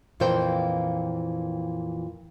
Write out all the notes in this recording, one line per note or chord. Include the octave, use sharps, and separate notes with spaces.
F2 A#2 E3 A#3 C5 G5